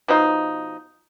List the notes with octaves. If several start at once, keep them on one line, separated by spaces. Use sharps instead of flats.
B2 F3 D#4